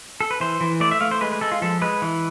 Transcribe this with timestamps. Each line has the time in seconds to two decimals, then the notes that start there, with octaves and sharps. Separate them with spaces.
0.21 A4
0.31 B4
0.40 E3 C5
0.61 E3
0.80 A3 D5
0.91 E5
1.01 A3 F5
1.11 C5
1.21 G#3 B4
1.32 B4
1.41 G#3 A4
1.52 F4
1.62 F3 A4
1.82 G#3 B4
2.02 E3